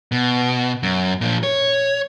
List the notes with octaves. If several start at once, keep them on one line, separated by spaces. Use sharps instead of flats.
B2
F#2
A#2 F3
C#5